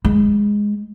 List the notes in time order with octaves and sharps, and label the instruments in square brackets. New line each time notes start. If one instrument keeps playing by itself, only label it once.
[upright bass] G#3